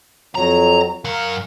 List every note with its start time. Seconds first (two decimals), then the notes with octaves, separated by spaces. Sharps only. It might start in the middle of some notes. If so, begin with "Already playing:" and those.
0.35 F2 F#3 A#5
1.05 F#2 A#4 F5 F#5